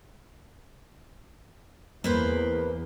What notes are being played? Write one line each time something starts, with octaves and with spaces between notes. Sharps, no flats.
E2 A#3 B4 C5